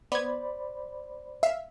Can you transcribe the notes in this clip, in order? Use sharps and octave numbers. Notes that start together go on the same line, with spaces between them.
B3 C5 D5 B5 G#6
E5 F5